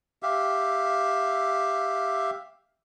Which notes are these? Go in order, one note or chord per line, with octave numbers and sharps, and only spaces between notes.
G4 E5 F5